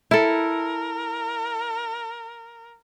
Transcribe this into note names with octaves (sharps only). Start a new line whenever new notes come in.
E4 A4 A#4